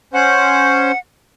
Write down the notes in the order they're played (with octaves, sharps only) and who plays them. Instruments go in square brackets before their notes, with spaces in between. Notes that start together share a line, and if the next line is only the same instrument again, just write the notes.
[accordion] C#4 C5 [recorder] F#5